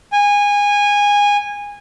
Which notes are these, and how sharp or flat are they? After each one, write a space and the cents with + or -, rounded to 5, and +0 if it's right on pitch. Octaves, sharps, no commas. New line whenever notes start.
G#5 -20